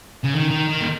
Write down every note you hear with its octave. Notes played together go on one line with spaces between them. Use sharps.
C#3
D#3
D#3
D#3
A#2